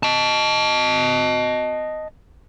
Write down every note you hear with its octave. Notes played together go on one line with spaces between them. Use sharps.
D#5 A5